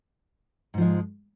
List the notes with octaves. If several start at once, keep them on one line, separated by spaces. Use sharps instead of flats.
G#2 F3 G#3